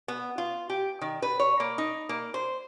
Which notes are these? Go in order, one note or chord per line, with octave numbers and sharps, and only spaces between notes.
B3
F4
G4
D#3
B4
C#5
A#3
D#4
A#3
C5